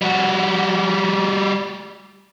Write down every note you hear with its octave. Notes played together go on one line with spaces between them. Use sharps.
G3 F#4